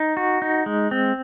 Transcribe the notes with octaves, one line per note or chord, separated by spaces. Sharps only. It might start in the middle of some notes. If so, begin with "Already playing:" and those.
Already playing: D#4
F#4
D#4
G#3
C4